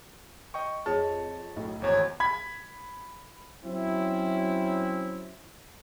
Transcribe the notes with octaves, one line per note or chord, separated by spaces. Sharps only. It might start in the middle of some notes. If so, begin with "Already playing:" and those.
D#5 G5 C#6
F2 G#4 C#5 D#5 A5
B1 A2
G#1 E2 C#5
B5 G#6 B6
F#3 C4 C#4 E4